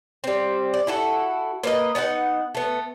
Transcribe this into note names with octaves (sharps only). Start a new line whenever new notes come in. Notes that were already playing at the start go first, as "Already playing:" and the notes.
G3 C4
D5
E4 F#4 A4
A#3 B4 D#5
B3 D4 D#4 F#5
A3 B3